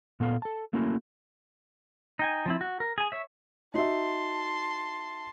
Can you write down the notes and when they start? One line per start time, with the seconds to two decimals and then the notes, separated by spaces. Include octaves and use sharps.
0.20 A#2 B3 A4 F5
0.42 A4 A5
0.73 A3 A#3 C#4 E4 F#4
2.19 D#4 G5 G#5
2.46 F3 C4 E4
2.61 F#4
2.80 A#4
2.98 G#4 G#5
3.12 C#5 E5
3.74 D#4 F#4 E5 A5 C6